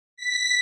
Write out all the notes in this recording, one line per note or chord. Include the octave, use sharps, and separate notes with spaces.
B6